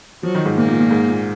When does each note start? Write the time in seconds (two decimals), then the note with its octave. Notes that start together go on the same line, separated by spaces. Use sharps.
0.23 F3 F#3
0.35 D#3
0.45 G#2
0.57 A#2 A#3
0.68 A#2
0.80 A#2
0.91 G#2
1.08 A#2